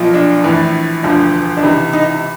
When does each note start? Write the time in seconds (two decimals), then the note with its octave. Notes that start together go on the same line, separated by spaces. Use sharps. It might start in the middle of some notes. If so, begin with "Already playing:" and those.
Already playing: B1 A#2 F3
0.14 D4
0.44 A#1 A2 E3
1.03 E1 D2 D3 F3
1.57 D4
1.63 C#2 C3 E3 D#4
1.93 D#4